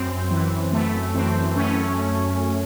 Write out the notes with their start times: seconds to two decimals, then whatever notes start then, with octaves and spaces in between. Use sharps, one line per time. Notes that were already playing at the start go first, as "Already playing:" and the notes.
Already playing: F#2 C4
0.31 E3
0.73 F#2 A3
1.14 E3 C4
1.56 F#2 A3 C#4